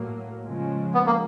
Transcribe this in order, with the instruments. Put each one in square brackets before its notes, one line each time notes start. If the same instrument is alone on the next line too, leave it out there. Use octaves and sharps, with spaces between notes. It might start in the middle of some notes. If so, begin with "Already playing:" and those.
Already playing: [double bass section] A2 F#3 A#3
C#3 F3 G#3
[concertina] B3
A#3